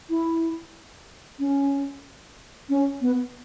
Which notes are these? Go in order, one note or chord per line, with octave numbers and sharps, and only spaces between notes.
E4
C#4
C#4
B3